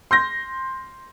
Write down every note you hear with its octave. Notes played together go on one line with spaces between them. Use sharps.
C6 G6 A#6